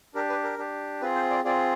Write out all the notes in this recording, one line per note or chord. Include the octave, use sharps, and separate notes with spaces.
D4 G4 A#4
B4
A#4
D4 G4
C4 F4 G#4 B4
C5
D5
C4 F4 G#4 D5